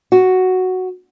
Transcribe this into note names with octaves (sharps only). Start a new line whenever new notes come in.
F#4